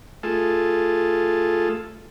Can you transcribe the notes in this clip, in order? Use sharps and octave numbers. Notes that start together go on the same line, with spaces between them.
A3 F4 G#4 A4